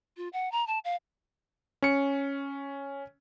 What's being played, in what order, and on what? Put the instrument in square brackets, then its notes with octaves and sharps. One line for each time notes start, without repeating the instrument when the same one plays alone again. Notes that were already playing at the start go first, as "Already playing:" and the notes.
[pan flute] F4
F#5
A#5
A5
F5
[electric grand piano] C#4 C#7